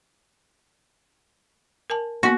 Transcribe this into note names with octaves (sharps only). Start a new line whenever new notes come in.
A#4 G#5 A5
A#3 B3 F#4